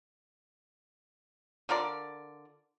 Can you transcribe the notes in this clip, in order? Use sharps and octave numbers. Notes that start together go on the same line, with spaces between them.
D3 F4 A#4 D5